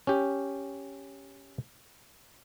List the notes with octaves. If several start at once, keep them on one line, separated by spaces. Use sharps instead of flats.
C#4 G4